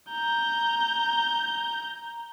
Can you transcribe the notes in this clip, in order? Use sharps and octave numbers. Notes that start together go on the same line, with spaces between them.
A#5 G6